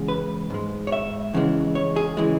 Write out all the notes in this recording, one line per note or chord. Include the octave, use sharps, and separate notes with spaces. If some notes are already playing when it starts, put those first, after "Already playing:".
Already playing: E2 C#3 G#3
B4
G#2 G#3
C#5
E5
E2 C#3 E3 G#3
C#5
G#4
C#3 E3 G#3